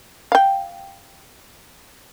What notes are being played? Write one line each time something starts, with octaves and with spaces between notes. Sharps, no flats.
F5 G5